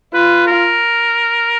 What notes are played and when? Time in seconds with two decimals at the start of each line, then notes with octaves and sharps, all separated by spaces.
0.14 F4 B4
0.47 A#4